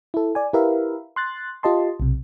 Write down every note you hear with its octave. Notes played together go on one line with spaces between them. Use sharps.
E4 A4
D5 G#5
E4 G4 A#4 B4 E5 F5
C6 F#6 A6
F4 G4 D#5 A5 C6
B1 C3